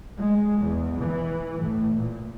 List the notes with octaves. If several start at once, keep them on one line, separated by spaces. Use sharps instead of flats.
G#3
E2
E3
A2
A#2